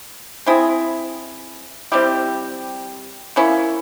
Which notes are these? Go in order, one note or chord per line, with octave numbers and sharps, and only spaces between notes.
C4 E4 G#4
G3 C4 E4 G4
A#3 C#4 E4